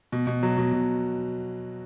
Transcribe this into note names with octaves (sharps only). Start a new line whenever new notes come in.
B2
B2
F#3
B2
B2